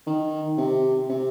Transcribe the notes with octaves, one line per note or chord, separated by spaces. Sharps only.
D#3
C3
C3